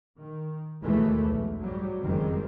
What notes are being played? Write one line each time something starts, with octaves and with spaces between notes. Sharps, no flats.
D#3
D#2 B2 E3 G#3 A3
B1 E2
G#2 F#3 G3
F#1 F2 D#3 G3 G#3 C4